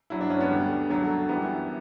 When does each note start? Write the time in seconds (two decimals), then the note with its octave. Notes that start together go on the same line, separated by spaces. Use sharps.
0.10 G2 F#3 E4
0.21 D4
0.30 C#4
0.41 B3
0.50 D2 D3 G3
0.90 F#2 D3 F#3
1.29 F#2 E3 G3 B3